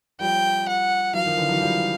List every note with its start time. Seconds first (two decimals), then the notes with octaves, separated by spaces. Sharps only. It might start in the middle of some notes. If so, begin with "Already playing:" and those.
0.20 F3 G3 G5
0.68 F#5
1.14 E3 F#3 F5
1.25 D#3 F3
1.37 D3 E3
1.49 E3 F#3
1.61 F3 G3